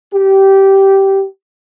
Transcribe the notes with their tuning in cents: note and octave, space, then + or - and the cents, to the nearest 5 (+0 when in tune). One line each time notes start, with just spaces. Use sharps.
G4 -15